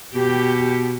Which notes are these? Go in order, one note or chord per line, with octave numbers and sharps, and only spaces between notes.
B2 G4